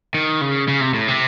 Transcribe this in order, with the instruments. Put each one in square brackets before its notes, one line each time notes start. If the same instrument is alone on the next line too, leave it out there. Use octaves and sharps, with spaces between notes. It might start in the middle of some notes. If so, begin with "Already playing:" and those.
[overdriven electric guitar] D#3
C#3
C#3
C3
A2
C3